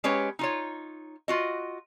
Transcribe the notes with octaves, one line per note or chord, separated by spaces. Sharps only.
G#3 C#4 G4 B4 C#5
D#4 F4 C#5
F4 F#4 D#5